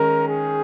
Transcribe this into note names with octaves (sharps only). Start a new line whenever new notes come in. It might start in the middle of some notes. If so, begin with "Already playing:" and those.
Already playing: D#3 G#3 C#4 A#4
G#4